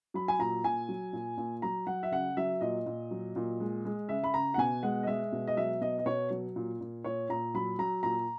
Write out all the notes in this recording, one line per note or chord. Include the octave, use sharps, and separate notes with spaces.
F#3 B5
G#5
A#2 A#5
A#2 G#5
F#3
A#2
A#2
F#3 A#5
F#3 F#5
E5
C#3 F#5
F#3 E5
A#2 D#5
A#2
F#3
A#2
G#3
G#3
C#3 E5
B5
C#3 A#5
F#5
B2 G#5
G#3 F#5
D#5
G#3 E5
B2
D#5
F#3 E5
B2 D#5
D#5
B2 C#5
F#3
A#2
A#2
A#2 C#5
A#2 A#5
F#3 B5
F#3 A#5
A#2 A#5